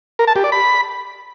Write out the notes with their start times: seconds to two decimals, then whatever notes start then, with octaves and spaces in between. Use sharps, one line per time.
0.19 A#4
0.27 A5
0.36 G4
0.44 D5
0.52 B5